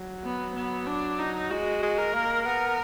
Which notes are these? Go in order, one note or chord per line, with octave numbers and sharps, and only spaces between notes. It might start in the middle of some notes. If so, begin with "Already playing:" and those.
Already playing: F#3
B3
B3
D4
D#4
G#3 F#4
G#3
A#4
A#3
B3 A#4